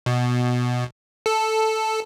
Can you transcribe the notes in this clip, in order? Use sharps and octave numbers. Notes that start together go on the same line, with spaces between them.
B2
A4